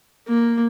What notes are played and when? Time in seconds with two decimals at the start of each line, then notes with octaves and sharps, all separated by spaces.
0.27 A#3